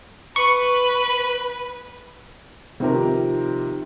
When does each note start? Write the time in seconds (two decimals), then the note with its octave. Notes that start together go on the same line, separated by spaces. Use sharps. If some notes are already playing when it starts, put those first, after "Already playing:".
0.36 B4 C#6
2.80 C3 D#3 F3 C4 G4 A#4